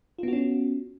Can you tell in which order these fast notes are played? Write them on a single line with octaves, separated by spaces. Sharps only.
F4 B3 F#4 C#4